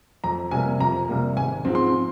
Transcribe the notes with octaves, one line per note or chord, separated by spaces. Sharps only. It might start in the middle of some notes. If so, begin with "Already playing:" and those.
F2 A#5
C3 G3 A#3 G#5
F2 A#5
C3 G3 A#3
G#1 G#5
G#2 F3 C4
C6